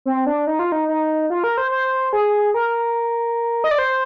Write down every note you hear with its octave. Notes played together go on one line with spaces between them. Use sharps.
C4
D4
D#4
F4
D#4
D#4
F4
A#4
C5
C5
G#4
A#4
D#5
D5
C5